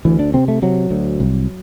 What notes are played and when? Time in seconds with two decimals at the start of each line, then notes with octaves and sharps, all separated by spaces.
0.05 D2 E3
0.19 D4
0.34 C3 C4
0.48 A3
0.62 C3 F#3
0.91 D2
1.20 C2